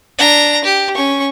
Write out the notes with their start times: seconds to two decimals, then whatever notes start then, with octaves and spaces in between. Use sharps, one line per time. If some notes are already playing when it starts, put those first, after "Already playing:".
0.19 D4 A#5
0.65 G4
0.95 C#4 C#6